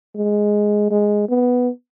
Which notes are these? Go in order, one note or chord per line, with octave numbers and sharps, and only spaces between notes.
G#3
G#3
B3